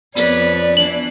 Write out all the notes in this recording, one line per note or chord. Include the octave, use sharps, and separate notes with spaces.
F2 B3 B4 C#5 D5
E3 D4 F#7